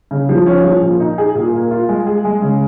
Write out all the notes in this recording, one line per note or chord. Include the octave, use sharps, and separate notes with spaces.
C#3
F3
C#4
F3
A#2
D#4
G#4
A#2
A#3
F4
G#3
G#4
G#3
C#3